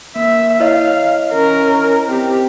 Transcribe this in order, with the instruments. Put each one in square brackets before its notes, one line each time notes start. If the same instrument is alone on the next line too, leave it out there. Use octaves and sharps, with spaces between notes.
[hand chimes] A#3 [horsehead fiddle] E5
[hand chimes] E4 C#5 D#5 [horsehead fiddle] F5
[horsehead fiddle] C#4 A#4
C4 G4